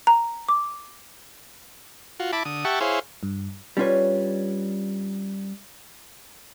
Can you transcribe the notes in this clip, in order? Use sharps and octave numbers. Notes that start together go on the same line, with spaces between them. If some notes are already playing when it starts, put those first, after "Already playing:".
A#5
D6
F4 F#4
E4 A5 B5 D6
D3 D#6
G4 E5 F#5 A5 C#6
E4 G#4 C5 C#5 F5
G2
G3 C#4 D4 F4 B4 C#5